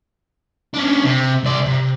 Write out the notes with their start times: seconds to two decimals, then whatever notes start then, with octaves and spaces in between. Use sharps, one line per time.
0.74 C#4 D4
1.04 C3
1.44 C2 D5
1.66 C3